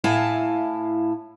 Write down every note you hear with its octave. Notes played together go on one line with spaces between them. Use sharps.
A2 E4 F5 G#5 A5